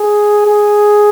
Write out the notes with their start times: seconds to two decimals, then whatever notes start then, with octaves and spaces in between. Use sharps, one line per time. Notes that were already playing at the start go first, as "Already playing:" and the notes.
Already playing: G#4
0.46 G#4